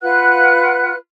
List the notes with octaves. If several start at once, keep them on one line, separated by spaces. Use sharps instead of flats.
F4 B4 F#5 F#6